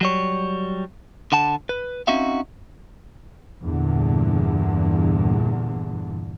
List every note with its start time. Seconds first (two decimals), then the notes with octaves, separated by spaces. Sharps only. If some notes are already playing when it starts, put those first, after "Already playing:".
0.01 F#3 G3 C#5
1.32 D3 F#5 A5
1.69 B4
2.07 C4 C#4 D#4 F#4 E5 F5
3.62 E2 G2 A#2 D3